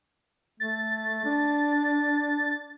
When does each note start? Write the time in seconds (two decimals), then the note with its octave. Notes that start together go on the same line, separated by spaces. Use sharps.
0.60 A3 A6
1.25 D4